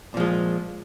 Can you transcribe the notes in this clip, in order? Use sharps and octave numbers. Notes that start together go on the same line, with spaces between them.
A#2 F3 G#3